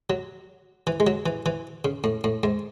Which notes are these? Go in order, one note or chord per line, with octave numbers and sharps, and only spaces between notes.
F#3
E3
G#3
F#3
E3
E3
C#3
A2
A2
G#2